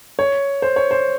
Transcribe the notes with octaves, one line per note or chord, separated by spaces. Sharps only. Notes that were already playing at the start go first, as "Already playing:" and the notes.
C#5
C5
C#5
C5